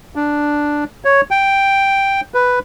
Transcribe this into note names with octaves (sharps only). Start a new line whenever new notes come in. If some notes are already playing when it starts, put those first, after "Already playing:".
D4
C#5
G5
B4